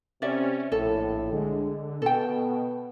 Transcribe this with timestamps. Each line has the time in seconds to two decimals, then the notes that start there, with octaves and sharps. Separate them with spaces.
0.22 C3 C#4 D5 E5
0.72 A#1 A2 A4
1.32 D3 G#3
2.02 B2 B3 A4 G5